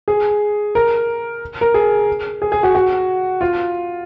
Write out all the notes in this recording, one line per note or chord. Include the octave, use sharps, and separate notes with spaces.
G#4
A#4
A#4
G#4
G#4
G#4
F#4
F#4
F4